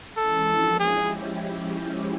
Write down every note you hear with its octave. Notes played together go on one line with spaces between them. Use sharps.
E3 G#3 C#4 E4 A4
F3 A#3 D4 F#4
F3 G#3 C#4 E4 G4 G#4